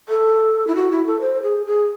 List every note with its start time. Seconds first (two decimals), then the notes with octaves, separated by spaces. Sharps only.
0.09 A4
0.67 E4
0.76 F#4
0.91 E4
1.07 A4
1.21 C5
1.43 G#4
1.66 G#4